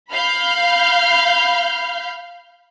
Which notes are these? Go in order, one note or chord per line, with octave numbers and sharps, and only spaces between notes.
F5 B5 F6 G6